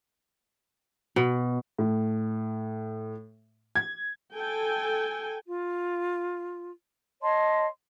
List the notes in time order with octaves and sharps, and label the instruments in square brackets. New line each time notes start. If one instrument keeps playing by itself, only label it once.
[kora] B2
[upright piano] A2
G#6
[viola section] A4 G5 G#5
[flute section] F4
C#5 D#5 A5 C6